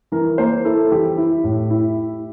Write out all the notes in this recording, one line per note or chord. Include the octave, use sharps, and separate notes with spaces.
E3 A#4
A#3 C5
E4 A4
E3 G4
E4
A2
E4